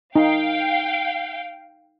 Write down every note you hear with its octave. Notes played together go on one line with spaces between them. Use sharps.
D#4 F5 G5